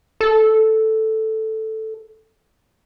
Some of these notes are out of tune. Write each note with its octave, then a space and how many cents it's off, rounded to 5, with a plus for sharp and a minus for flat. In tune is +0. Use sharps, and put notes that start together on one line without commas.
A4 +0